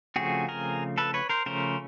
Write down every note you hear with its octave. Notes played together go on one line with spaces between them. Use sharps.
C#3 F3 A3 C4 F#4 G#4
G#4 A#4
A4 B4
B4 C#5
A#4 C5
C#3 F3 A3 C#4 A#4 C5